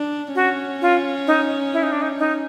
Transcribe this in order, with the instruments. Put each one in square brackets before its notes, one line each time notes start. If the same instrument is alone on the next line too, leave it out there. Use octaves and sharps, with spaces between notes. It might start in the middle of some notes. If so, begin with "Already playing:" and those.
Already playing: [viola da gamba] D4
[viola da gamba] C#4 [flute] F#4
[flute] F4
D#4
E4
D#4
D4
D#4
D#4